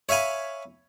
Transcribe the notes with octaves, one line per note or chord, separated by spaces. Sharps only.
C#5 E5 F5 G#5 B5